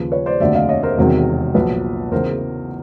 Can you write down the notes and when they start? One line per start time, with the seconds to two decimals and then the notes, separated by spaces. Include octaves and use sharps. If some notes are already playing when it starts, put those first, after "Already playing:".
Already playing: D#2 C#3 F3 B4
0.12 B4 C#5
0.26 C5 D5
0.40 F1 D#2 D3 F#3 D5 E5
0.55 D#5 F5
0.69 C#5 D#5
0.83 A#4 C5
0.97 E1 E2 C3 D#3 F#3
1.54 B1 A#2 F3 B4
2.11 E2 C#3 E3 A#4 C5